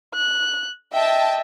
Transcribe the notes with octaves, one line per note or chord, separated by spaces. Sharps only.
F#6
D#5 E5 G5 A5